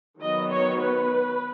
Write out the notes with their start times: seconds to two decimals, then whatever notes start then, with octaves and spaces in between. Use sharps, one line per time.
0.21 D#3 F#3 B3 D#5
0.51 C#5
0.81 B4